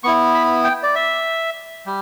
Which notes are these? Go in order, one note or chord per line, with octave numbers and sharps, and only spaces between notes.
B3 E4 C#6
B5
G5
D5
E5
G3